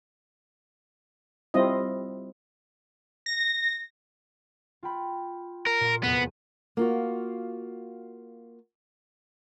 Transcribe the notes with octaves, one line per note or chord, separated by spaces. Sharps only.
G3 C4 E4 F4 D#5
A#6
F4 G5 B5
A#4
A#2 F4 F5
F1 E2 B3
A#3 F4 F#4